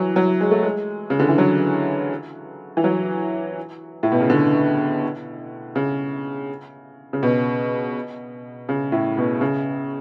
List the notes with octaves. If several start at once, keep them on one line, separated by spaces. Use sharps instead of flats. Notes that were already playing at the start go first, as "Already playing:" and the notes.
Already playing: E3 F#3
F#3
G#3
A3
G#3
C#3
D3
E3
F#3
E3
F#3
A2
B2
C#3
D3
C#3
C#3
B2
C#3
A2
B2
C#3